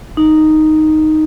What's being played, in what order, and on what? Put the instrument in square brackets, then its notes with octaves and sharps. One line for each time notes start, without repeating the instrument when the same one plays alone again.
[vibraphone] D#4